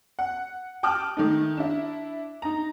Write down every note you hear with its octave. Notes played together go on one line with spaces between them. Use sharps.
F#5
G5 A5 D6 D#6 F6 F#6
D#3 A3 D#4
D4 E4
D#4 A#5